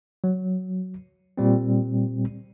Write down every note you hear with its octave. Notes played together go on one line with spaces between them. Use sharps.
F#3
A#2 G3 C4